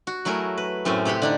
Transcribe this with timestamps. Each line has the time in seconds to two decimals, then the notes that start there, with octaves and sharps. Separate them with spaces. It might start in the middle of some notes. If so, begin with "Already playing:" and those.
0.07 F#4
0.25 F#3 A3 E4 G#4 A#4
0.58 B4
0.85 F#2 A2 C4 C#4
1.05 C3 G4 F#5 B5 C6
1.22 D3 D4 D#4